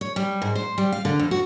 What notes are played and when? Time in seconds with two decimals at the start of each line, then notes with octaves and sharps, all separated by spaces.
0.01 C#5
0.16 G3
0.42 G#2
0.55 C5
0.78 G3
0.92 F5
1.05 D3
1.19 F2
1.31 F#4